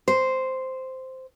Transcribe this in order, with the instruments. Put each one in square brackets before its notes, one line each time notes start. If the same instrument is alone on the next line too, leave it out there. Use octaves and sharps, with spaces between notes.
[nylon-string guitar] C5